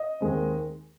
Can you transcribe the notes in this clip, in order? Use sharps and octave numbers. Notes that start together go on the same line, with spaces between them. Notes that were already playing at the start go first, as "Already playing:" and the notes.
Already playing: D#5
D#2 D#3 G#3 C4